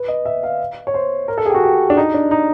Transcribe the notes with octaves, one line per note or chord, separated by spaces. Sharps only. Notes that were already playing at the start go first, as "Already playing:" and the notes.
Already playing: B4
D#5
E5
F5
C#5
C5
A#4
A4
G#4
G4
F#4
G4
D4
D#4
D4
D#4